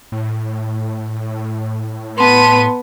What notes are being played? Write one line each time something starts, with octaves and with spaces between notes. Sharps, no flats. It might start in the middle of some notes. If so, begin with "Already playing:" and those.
A2
B3 A5 C6 D#7